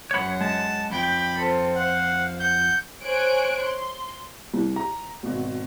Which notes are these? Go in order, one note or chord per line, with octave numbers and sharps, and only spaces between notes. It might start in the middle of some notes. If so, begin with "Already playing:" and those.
F#2 C#5 F#5 B5
G#3 A5
F2 G5 B5 D6 G6
C4 F4 A4
C5 F5 F#5
F#5 G6
C5 C#5 G#5 F#6 D7
C6
C2
A#5
G#1 B2